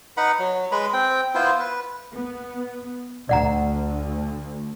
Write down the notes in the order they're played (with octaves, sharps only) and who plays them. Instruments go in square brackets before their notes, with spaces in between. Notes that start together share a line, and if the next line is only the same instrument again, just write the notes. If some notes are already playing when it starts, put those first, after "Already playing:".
[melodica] D#4 B4 F#5 B5
F#3
G#3 B4 B5
C4 G5
B3 E4 F4 C5
B4
[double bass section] B3
[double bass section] D2 [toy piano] D5 F#5 A#5